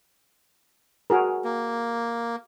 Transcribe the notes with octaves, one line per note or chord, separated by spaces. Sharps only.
F#4 G#4 A#4
A#3